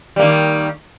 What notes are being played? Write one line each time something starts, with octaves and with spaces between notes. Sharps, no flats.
D#3 G3 A#3